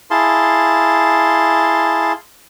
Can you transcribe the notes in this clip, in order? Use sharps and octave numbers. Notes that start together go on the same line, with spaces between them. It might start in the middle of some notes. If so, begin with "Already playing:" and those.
E4 G#4 F5 A5 C6